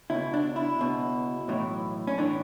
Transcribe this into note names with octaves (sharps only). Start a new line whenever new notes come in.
C#2 B2 E4
D4
E4
C#2 B2
B1 A2 E3
C#4
A2 E3 D4